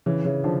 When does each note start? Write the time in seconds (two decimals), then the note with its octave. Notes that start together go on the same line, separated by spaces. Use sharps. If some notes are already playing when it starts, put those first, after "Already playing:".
0.06 C#3 E3
0.25 C#3 E3
0.44 D3 F3